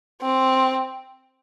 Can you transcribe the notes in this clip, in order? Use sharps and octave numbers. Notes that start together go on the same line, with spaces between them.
C4